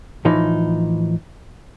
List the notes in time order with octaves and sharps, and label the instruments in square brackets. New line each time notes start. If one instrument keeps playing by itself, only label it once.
[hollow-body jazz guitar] A2 E3 F3 D#4